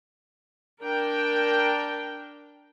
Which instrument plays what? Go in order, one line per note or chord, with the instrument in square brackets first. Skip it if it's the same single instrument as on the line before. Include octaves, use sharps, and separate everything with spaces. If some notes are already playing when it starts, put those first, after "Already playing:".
[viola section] D4 A#4 G5